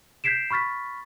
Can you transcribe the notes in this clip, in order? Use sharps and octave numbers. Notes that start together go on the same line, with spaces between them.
G6 G#6 B6 C7 D7 E7
B5 C#6 F6 A6 B6